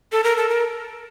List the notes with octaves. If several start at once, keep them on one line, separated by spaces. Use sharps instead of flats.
A4
A#4
A4
A#4